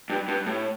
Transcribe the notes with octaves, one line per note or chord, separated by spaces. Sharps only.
G2
G2
A2